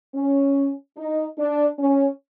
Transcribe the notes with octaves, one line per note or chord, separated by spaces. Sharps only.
C#4
D#4
D4
C#4